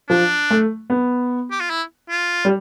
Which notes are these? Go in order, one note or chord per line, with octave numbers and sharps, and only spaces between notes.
F3 D4
A3
B3
G4
F4
E4
F4
G3